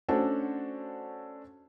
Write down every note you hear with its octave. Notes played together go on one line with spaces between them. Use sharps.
A3 C#4 D4 F#4 A4 C5